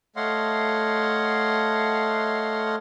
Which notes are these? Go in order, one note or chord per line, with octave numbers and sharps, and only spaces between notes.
A3 C#5 D#5 F5 F#5 C6